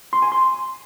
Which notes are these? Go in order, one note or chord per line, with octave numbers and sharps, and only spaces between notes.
C6
G#5
C6